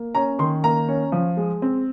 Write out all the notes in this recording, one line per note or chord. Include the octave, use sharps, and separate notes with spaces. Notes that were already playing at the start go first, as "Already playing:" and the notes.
Already playing: A#3
C#4 A#5
D#3 C6
A#3 A#5
C#4
F3
G#3
C4